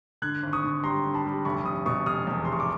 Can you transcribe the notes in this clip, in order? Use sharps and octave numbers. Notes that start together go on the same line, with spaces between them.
D3 F#6 G#6
G#1
C#6 D#6
D3
G3 A#5 C6
D3
A5 B5
G3
F1 B5 C#6
F1 C#6 D#6
B2 C#6 D#6
F1 D#6 F6
E2
F1 C6
C#6
D6